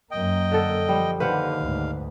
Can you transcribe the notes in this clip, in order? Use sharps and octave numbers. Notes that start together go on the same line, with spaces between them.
F#2 A#3 D#5 G5
D3 A4
F3 G3
D#2 D3 B4 C5 F5 F#5
D2 G#2